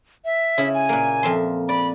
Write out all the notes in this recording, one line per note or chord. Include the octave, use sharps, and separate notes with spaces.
E5
C#3 E4
G#5
A#2 A#3
F2 E5 C6
D5 B5